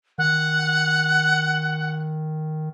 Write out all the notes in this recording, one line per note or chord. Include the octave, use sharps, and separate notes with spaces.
D#3 F#5